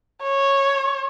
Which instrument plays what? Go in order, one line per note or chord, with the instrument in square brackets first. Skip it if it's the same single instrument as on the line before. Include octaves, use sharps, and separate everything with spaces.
[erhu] C#5